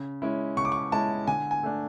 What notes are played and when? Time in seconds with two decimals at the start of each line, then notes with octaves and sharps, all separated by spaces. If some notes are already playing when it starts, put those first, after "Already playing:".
Already playing: C#3
0.22 G#3 C#4 E4
0.57 C#3 C#6
0.65 D6
0.72 C#6
0.92 G#3 C#4 E4 A5
1.27 D3 G#5
1.51 G#5
1.63 A3 D4